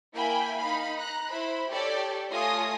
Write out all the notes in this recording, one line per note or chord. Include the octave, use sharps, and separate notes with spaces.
A#3 E4 G5 G#5 B5
D#4 F5 B5
A#5 F#6
E4 C5 B5
G4 A4 C#5 D5 G5
A3 F4 C#5 G#5 D#6 A#6